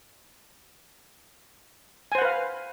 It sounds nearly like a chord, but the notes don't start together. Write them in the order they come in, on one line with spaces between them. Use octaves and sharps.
G#5 C5 F#5 B4 F5